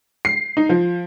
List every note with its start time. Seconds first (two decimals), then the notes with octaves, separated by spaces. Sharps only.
0.25 C7
0.57 D#4
0.69 F3